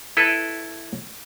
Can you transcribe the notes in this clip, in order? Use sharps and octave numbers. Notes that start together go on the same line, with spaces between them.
E4 A4 B4